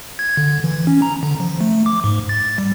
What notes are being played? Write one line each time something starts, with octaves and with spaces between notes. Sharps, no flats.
G#6
D3
E3
C#4
A#5
D3
F3
A3
D6
G#2
A6
G3